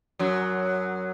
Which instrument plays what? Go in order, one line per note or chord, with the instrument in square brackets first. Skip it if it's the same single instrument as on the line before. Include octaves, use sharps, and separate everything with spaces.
[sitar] F#2 F#3